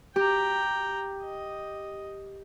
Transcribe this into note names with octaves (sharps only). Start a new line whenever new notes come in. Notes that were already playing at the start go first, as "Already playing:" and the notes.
G4 G5 A#5
D#5